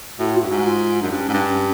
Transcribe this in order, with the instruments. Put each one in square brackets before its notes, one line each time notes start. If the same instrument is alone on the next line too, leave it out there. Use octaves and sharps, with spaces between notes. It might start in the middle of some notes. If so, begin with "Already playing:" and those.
[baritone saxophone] A2 [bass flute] F#4
[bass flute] F4
[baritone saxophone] G2 [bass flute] F#4
[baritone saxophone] G#2
[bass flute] F4
[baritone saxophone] F#2 [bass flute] D4
[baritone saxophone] G2 [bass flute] C#4
[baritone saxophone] G#2
G2